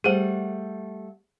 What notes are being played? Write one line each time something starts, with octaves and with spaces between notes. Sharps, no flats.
G3 A3 G#4 C5 F#5